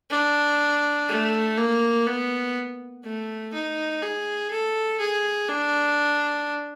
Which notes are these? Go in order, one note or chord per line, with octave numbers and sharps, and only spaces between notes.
D4
A3
A#3
B3
A3
D#4
G#4
A4
G#4
D4